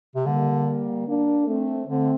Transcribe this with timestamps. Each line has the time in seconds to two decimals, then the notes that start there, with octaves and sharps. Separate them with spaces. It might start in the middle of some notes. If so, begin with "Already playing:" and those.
0.15 C3
0.26 D3 G3 A#3
1.07 A#3 D4
1.46 A3 C4
1.87 D3 A3 C4